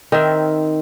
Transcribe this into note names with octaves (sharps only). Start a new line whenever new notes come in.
D#3 C4 E5